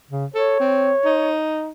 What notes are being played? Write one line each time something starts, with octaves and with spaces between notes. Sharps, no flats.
C#3
A4 C#5
C4
D#4